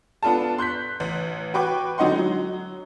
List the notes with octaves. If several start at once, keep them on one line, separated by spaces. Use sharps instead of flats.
B3 D4 F4 A4 A5
C6 F#6 G6 B6
A1
F#4 B4 G5 C#6 D6 F#6
D3 F#3 D#4 D#5 F#5 C6
F#3